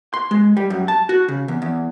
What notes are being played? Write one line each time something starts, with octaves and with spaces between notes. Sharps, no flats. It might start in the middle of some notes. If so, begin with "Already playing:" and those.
C6
G#3
G3
F#2
A5
F#4
C#3
E2
E2